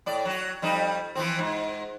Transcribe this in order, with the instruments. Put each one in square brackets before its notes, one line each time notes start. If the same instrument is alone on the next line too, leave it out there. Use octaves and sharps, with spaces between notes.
[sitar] A2 D5
F#3 F#4
F2 G3 D#4
E3 F3 C4
G#2